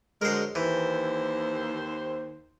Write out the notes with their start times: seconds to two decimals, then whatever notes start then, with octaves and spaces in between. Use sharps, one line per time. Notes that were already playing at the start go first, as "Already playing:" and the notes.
0.22 D3 F#3 G#3 A#4 C5
0.55 D#2 E3 C5